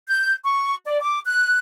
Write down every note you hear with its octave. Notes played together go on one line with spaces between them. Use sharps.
G6
C#6
D5
D6
F#6